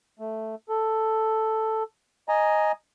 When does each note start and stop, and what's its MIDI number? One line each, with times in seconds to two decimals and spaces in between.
0.19 0.55 57
0.69 1.83 69
2.29 2.72 75
2.29 2.72 80
2.29 2.72 82